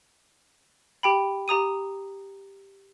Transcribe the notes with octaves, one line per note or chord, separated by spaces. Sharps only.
G4 G5 B5
G4 A#5 D#6 D#7